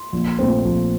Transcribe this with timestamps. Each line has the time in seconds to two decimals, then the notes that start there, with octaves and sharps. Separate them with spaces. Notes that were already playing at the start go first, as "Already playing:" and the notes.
Already playing: C6
0.13 A#1
0.39 A#2 A3 C4
0.65 A#1